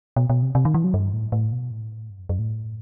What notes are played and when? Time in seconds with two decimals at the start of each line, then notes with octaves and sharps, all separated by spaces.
0.16 B2
0.30 B2
0.43 C3
0.55 C3
0.65 D#3
0.74 E3
0.84 F#3
0.94 G2
1.13 A2
1.32 A2
1.52 B2
1.71 A2
2.10 G2
2.19 F#2
2.29 F#2
2.39 A2